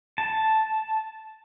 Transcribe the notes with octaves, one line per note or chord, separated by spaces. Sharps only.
A5